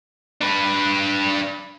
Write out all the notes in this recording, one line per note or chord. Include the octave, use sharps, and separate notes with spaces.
D4 B4